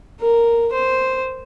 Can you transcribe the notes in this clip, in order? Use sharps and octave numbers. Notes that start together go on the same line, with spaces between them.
A#4
C5